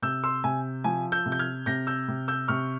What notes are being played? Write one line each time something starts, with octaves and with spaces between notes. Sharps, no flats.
C3 E6 G6
C6 E6
C3 G#5
F3 G#5
E6 G6
C3
G6
F6 G#6
C3 G6 A#6
E6 G6
C3
E6 G6
C3 C#6 F6